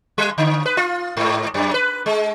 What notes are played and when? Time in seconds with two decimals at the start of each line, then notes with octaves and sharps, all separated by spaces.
0.18 G3
0.38 D3
0.66 B4
0.77 F4
1.17 G#2
1.54 F#2
1.74 B4
2.06 G#3